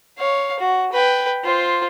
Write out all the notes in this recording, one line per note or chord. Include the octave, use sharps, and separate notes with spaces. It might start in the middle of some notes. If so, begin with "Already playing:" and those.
C#5 F5
F#4
B4 G5
F4 C5